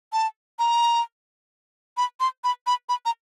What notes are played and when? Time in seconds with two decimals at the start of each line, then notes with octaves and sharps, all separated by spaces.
0.13 A5
0.59 A#5
1.97 B5
2.20 C6
2.44 B5
2.67 B5
2.89 B5
3.05 A#5